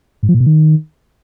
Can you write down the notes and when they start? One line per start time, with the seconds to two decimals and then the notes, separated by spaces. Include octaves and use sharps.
0.23 G#2
0.29 F3
0.34 A#2
0.40 B2
0.46 D#3